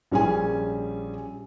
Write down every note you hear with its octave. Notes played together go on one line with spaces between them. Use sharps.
A#1 G3 C#4 G#4 G#5